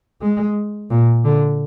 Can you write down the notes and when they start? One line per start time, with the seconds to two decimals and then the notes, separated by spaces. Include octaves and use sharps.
0.22 G#3
0.91 A#2
1.24 D3